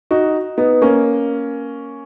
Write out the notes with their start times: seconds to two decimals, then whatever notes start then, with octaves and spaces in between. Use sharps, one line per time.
0.11 D#4 F#4
0.58 B3 D#4
0.82 A#3 C#4